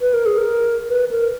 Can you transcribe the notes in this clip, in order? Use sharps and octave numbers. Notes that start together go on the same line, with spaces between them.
B4
A#4
G#4
A#4
B4
A#4